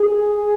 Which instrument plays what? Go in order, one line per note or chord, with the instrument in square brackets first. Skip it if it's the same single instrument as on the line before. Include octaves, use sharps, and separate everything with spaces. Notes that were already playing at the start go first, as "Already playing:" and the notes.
Already playing: [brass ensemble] G#4